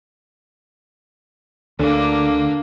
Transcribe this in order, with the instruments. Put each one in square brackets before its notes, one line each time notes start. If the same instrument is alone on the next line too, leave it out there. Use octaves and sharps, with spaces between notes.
[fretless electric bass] D2 [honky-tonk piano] D3 [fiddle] A#3 D4